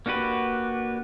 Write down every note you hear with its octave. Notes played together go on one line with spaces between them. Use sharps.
A#3 D4 F#4 G4 B4